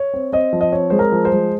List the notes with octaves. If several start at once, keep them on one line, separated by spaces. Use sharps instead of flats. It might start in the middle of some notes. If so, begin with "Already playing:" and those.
Already playing: C#5
C4
C4 D#5
F3
D#5
C4 C#5
G#3 C5
A#4
F3
C5
G#3